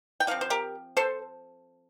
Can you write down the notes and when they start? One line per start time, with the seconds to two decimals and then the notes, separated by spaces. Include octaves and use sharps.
0.20 G5
0.27 D3 F3 C4 F5
0.41 C5
0.50 G4 A#4
0.97 A4 C5